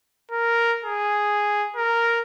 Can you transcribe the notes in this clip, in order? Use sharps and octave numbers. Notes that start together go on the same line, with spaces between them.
A#4
G#4
A#4